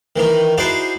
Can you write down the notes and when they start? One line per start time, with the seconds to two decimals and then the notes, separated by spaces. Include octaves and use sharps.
0.16 D#3 E3 D#4
0.58 D#4 E4 F#4 G#4 C5 D5